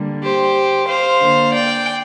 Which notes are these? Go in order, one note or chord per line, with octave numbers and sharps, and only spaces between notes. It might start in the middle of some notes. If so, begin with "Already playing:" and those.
Already playing: D3 G3 A#3
G4 C5
C5 F5
D3 A#3
D5 G5